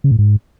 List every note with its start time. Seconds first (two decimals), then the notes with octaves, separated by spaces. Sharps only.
0.04 C#3
0.11 A2
0.19 G#2